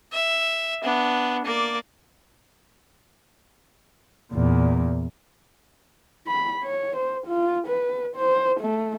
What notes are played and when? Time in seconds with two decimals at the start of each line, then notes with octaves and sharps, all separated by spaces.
0.13 E5
0.84 B3 D4
1.45 A#3 D5
4.32 E2 A#2
6.27 B5
6.63 C#5
6.96 C5
7.27 F4
7.67 B4
8.16 C5
8.61 A3